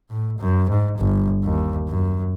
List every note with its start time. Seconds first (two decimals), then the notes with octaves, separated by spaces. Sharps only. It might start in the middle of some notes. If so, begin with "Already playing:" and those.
0.10 A2
0.39 F#2
0.69 G#2
0.99 G1
1.44 D#2
1.89 F#2